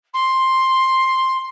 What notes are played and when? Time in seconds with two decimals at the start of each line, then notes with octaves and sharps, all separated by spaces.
0.13 C6